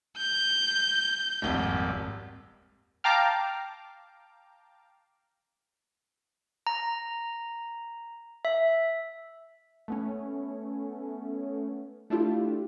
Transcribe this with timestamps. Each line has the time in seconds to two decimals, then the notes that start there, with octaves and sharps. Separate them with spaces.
0.18 G6
1.42 D#1 G#1 F2
3.04 F5 G5 A5 A#5 D6 F6
6.67 A#5
8.45 E5
9.88 A3 B3 C#4
12.10 A3 D4 E4 F4 G4